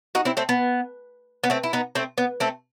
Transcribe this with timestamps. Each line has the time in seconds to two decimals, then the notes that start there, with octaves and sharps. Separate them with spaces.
0.15 D#4 F#4
0.25 C4 E4
0.37 A3 C4
0.49 B3
1.44 B3
1.50 A3 C4
1.63 E4
1.73 B3 D#4
1.95 A3 C4
2.18 B3
2.40 A3 C4